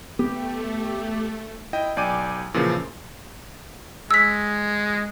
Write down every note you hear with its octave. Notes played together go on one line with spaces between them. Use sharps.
A3 B3 G4
E4 D#5 G5
B1 D5 G5 G#5 D6 D#7
A#2 C#3 E3 F3
G#3 E6 B6